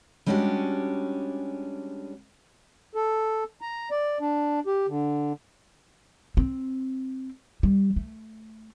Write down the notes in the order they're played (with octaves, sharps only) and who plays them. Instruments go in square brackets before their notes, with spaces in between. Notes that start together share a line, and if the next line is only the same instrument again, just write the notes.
[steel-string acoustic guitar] G3 G#3 C#4 D4 F#4 G4
[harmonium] A4
A#5
D5
D4
G4
D3
[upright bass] C4
G3
A3